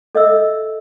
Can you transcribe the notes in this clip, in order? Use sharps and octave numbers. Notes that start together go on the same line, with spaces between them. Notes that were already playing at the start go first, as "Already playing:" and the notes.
A4 D#5 E5 E6